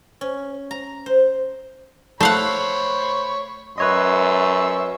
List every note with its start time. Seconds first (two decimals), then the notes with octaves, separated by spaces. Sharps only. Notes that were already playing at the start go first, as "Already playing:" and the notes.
0.21 C#4
0.71 A#5
1.06 C5
2.21 A3 C5 C#5 F5 F#5 B5
3.78 F#2 B4 C#5 D#5 E5 C6 C#6